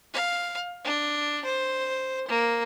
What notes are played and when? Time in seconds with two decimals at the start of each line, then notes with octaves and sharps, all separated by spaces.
0.13 F5
0.85 D4
1.45 C5
2.28 A#3